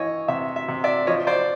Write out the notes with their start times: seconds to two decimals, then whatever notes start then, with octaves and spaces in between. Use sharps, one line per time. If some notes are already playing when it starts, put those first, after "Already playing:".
Already playing: E3 C#5 D#5
0.28 C3 E5
0.56 E5
0.68 C3
0.84 D5 E5
1.07 F3 C#5 D#5
1.27 C5 D5